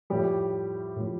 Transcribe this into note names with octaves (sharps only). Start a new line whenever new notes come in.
A2 F3 G3 G4
A2 F3